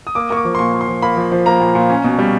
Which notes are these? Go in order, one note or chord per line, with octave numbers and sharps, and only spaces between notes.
D#6
A#3 D6
A#3 C#6
D6
F3
C6
A#2 C#6
A#3
C6
F3
A#3 B5
F3
F3
A#3 A#5
A#2
A#2
C#4
B2
G3